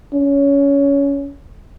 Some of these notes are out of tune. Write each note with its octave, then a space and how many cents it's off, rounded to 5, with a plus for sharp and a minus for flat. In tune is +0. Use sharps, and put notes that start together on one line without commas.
C#4 +20